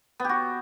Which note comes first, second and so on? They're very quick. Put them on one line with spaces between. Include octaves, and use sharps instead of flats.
B3 G4 F#4